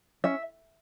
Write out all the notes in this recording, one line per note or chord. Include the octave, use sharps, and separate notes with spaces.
C#4 E5